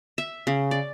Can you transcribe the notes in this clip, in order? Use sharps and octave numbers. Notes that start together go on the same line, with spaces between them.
E5
C#3
D5